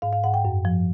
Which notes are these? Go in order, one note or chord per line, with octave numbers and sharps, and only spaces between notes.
G#2 F5
F5
G#2 F#5
G5
F#2
F3